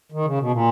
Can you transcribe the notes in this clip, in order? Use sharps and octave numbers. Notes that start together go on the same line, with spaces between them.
D#3
C#3
B2
A#2